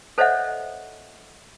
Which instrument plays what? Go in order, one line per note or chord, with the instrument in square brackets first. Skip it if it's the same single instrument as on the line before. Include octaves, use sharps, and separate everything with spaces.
[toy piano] A4 C5 C#5 D#5 E5 F#5